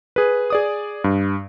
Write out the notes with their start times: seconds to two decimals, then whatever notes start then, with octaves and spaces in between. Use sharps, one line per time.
0.16 G#4 B4
0.50 G#4 D5 D#6
1.04 G2